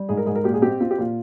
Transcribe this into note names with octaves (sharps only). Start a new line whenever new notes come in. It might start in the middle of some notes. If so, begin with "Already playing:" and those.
Already playing: G3
G#2 G#4
A#4
G#2 G#4
A#4
A#2 G4
G#4
C4 G4
C4 F4
G4
A#2 F4